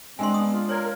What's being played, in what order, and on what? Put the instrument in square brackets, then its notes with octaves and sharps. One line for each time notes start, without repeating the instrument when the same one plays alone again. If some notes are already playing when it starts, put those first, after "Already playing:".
[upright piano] G#3 D4 [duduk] C4 [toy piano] G#5 C6
[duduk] B3 [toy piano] D#6
[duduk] F4
[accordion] A#4 [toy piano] C#5 D5